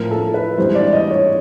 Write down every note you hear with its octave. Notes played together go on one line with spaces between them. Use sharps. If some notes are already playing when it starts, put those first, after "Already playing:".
Already playing: A2 F3 A#4
A4
B4
G#2 E3 G3 C5
D5
D#5
C#5